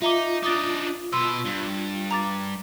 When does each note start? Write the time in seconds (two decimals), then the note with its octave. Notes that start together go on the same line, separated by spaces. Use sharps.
0.02 D#4 F4 E5 A#5 D6
0.43 D4 D#4 D6 D#6 A6
1.12 B2 B4 C6 E6
1.45 G2
2.11 A#5 D6 A6